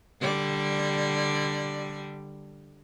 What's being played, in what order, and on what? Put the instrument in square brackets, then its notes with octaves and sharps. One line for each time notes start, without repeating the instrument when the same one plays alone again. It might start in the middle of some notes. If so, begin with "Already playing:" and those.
[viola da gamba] D3 G3 D5